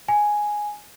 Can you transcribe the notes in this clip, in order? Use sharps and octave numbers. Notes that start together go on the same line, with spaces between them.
G#5